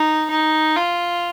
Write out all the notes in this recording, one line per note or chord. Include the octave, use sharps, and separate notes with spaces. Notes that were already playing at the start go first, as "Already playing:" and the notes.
Already playing: D#4
D#4
F4